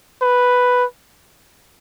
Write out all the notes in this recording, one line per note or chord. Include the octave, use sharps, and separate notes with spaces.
B4